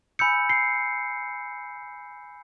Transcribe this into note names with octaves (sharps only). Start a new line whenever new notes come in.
G#5 B5 E6 G6 C#7
C7